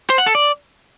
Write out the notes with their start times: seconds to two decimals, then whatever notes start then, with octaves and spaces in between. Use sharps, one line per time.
0.10 C5
0.18 F#5
0.26 A4
0.35 D5